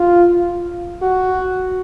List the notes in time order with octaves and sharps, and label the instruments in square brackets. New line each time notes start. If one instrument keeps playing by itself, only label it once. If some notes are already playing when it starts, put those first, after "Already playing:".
Already playing: [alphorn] F4
F#4